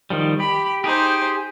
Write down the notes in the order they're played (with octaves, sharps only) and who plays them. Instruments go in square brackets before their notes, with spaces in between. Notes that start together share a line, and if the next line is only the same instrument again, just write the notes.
[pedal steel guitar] D#3 F3 G3
[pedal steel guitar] G4 [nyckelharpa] B5
[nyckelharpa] D#4 C5 [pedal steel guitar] G4 G#4